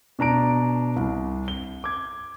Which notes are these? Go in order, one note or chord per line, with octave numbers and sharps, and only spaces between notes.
B2 D4 A#5 D7
C2
G7
D6 G#6